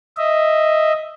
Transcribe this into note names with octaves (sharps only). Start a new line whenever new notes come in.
D#5 E5